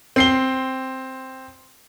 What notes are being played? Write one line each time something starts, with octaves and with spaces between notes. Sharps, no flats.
C4 C7 G7